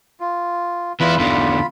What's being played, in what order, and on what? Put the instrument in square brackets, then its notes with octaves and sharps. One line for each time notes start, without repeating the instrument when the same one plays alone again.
[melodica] F4
[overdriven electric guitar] E2 E4 [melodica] F4 B4 B5
[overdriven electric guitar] E2 D3 [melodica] F4 B5